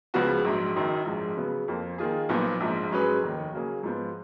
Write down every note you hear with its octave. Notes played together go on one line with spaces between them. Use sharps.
C#2 C#3 F3 B3 F#4
A#1 G#2 F#3
F#1 F#2 D#3 F#3
A#1 G#2 F3 G#3
C#3 F#3 B3
F2 F3 A#3
D#3 A#3 F4 G#4
B1 A#2 F3 B3
A#1 G#2 F3
G#2 F#3 C#4 G#4 B4
F1 D#2 D#3
C#3 F#3 A#3 C#4 G#4
G#2 F3 B3